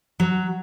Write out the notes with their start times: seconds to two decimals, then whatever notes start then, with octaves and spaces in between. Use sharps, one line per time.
0.20 F#3